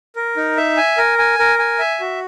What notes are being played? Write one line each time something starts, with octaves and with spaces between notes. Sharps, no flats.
A#4
D#4
E5
G#5
A#4
G#5
A#4
G#5
E5
F#4